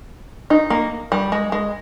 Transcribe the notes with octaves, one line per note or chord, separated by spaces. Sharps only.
D#4
A#3
G3
G#3
G#3